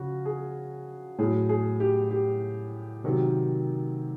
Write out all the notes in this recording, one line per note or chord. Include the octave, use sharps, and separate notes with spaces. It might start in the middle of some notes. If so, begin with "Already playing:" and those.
Already playing: C#3 F3 F#4
G#4
A2 F#3 G#4
G#4
G4
G4
C3 D#3 F#3